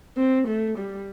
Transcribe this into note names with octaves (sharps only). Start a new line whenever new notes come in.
C4
A3
G3